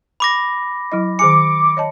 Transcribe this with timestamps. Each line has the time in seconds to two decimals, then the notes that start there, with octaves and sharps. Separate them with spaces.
0.20 B5 D6 A#6
0.92 F#3 E4 D#5
1.19 D#3 G#4 G#5 D6 C#7
1.77 C#5 D#5 A5